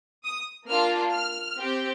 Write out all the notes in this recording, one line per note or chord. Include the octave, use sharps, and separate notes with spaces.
D#6
A#3 D4 F4 F6
F6
C4 G4